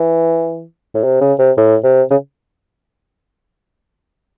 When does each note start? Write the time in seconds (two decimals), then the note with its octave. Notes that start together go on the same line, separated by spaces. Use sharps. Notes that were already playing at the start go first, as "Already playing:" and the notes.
Already playing: E3
0.95 A2
1.04 C3
1.21 C#3
1.39 C3
1.57 A2
1.84 C3
2.11 C#3